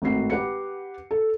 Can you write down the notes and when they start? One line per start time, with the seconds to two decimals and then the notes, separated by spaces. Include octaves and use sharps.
0.02 G#1 A2 C4 F#4 C7
0.30 G4 B4 F#5 C#7
1.11 A4